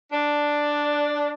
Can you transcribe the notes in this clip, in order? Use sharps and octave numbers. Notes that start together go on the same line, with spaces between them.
D4